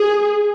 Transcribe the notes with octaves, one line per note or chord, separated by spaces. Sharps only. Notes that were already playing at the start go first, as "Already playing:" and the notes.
Already playing: G#4